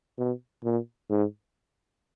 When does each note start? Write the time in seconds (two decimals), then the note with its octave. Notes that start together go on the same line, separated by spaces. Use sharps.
0.18 B2
0.64 A#2
1.10 G#2